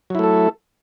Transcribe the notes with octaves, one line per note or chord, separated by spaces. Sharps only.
F#3 A3 E4 A4